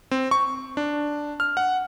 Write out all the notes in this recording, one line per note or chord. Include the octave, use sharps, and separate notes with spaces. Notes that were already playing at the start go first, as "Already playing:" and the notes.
C4
C#6
D4
F6
F#5